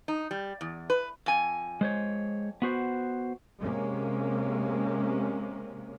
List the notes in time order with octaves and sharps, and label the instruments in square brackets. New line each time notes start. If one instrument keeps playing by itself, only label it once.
[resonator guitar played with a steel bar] D#4
G3
E2
B4
F2 G#5
[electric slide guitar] G#3 C5 C#5
B3 F#4 C5
[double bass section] C3 G#3 A#3 C#4